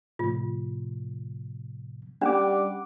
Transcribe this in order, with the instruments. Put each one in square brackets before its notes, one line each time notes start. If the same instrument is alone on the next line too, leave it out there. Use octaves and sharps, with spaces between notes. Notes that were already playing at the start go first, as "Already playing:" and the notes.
[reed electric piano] A2 C3 F3 [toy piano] F4
[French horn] G3 [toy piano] C#4 D4 [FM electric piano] F#5 D6